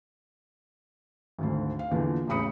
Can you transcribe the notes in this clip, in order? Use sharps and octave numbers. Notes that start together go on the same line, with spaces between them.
G#1 D2 D3
F5
E2 A#2 D3 E3 F3
E1 A1 C#3 B5 D#6 C#7